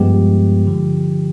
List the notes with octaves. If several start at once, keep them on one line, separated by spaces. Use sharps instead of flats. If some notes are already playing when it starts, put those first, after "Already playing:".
Already playing: G2 F3 G#3 B3 G4
D3 F3